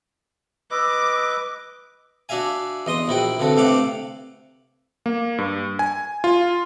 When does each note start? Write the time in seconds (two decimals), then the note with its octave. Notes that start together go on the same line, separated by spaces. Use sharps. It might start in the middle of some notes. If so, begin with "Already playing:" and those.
0.71 B4 D#5 D6 E6
2.29 D4 F#4 E5 F5 G#5
2.86 E2 D#5 C6 D#6
3.08 A#1 E4 F#4 G5
3.39 C2 G2 D3 F#4 A4
3.57 G2 C3 A3 F5 F#5 D6
5.06 A#3
5.38 G2
5.79 G#5
6.24 F4